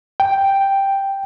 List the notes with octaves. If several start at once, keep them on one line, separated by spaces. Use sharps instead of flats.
G5